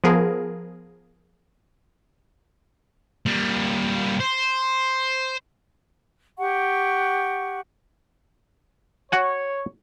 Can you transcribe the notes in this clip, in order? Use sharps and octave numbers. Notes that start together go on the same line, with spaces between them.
F3 B3 G#4 A#4
G3 A#3
C5
G4 F#5 C#6
F#4 C#5 F#5 G#5